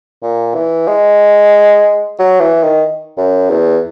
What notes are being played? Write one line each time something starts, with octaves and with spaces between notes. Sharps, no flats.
A#2
E3
G#3
F#3
E3
D#3
F#2
E2